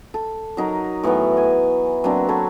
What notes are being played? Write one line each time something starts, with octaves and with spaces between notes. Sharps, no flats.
A4
F#3 D#4 A#4
A2 E3 F#3 B3
G#5
F#3 A#3 C4 D4
A4 B4 C#5 F#5